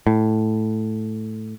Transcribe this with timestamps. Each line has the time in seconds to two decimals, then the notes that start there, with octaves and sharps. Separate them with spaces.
0.07 A2